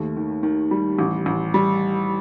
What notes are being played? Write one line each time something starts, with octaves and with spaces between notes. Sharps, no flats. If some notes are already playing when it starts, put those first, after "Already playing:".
Already playing: D#2 A3
D#3
D#3
G3
A1
A1
G3